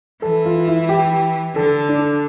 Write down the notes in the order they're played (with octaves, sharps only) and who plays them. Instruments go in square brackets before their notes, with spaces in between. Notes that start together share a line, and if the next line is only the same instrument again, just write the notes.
[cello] E3 [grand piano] A4
[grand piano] F4
E4
G4
[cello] D3 [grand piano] A4
[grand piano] D4